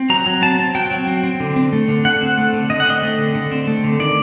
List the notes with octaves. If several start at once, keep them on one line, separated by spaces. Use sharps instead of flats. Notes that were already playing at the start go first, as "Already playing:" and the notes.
Already playing: C4
F#3 A#5
F#3
C4 A5
C4
F#3 G5
F#3
C4
C4
D3
C4
A3
D3
D3 F#5
C4
A3
D3
D3 D#5
F#5
C4 D#5
A3
D3
D3
C4
A3
D3
D#3 D5